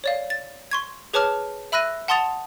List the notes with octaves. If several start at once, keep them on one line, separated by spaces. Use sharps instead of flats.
C#5 D5 F5
A6
C6 C#6 G#6
G#4 B4 C#5 A5 D6 F6
E5 B5 E6 F#6 A#6 D#7
F#5 A5 C6 D#6 A6 F7